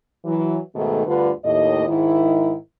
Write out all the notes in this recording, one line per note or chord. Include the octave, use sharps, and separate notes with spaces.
E3 F#3
G#2 B2 D#3 A3
D2 G2 D3 F4 B4
D#2 A2 D#5
G#2 D#3 E4